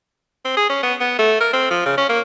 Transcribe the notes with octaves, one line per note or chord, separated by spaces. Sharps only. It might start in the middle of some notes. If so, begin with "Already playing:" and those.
C4
G#4
C#4
B3
B3
A3
A#4
C4
F3
C#3
C#4
A#3